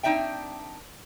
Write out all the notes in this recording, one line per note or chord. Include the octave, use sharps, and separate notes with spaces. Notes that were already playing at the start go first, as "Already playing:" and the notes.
C4 D4 D#4 D5 E5 G5